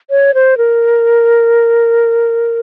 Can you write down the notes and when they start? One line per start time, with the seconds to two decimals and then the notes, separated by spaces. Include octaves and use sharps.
0.10 C#5
0.34 C5
0.58 A#4